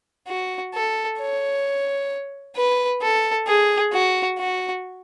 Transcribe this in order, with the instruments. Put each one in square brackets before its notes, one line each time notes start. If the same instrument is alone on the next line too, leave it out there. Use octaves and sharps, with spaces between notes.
[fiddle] F#4
A4
C#5
B4
A4
G#4
F#4
F#4